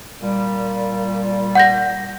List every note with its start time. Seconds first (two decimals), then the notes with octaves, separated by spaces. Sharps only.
0.22 A#2 G3
1.55 F#5 G6 A#6